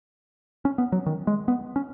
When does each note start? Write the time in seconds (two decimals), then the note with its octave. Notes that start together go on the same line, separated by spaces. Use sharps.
0.65 C#4
0.78 B3
0.92 F#3
1.06 D#3
1.27 G#3
1.48 B3
1.76 C#4